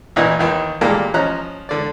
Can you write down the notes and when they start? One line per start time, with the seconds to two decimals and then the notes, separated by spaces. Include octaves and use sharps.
0.16 A1 A#2 E3 D#5 F#5
0.39 D#2 D#3 E3
0.81 A#2 G3 G#3 A#3 G4 A4
1.14 F3 C#4 D#5 A#5 F#6
1.69 D3 D5